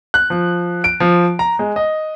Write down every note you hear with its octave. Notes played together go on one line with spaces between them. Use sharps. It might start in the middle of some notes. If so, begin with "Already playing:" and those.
F#6
F3
D7
F3
A#5
G#3
D#5